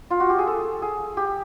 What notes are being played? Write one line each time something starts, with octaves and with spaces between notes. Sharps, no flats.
F4
F#4
G4
G#4
A4
G#4
G4